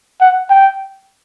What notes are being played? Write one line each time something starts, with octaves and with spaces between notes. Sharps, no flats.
F#5
G5